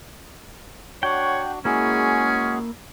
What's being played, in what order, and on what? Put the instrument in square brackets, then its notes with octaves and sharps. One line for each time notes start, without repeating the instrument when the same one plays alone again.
[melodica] D4 F#4 [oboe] C#5 [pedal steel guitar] F#5 G5
[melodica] G#3 F#4 G#4 [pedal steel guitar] A#3 E4 [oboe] C#4